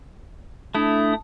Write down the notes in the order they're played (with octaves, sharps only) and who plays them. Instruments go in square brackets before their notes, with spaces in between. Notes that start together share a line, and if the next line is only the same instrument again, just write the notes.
[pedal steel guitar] A3 E4 [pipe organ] D4 D#6